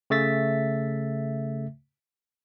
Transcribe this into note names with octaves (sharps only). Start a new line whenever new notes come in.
C#3 A3 E5 A6 B6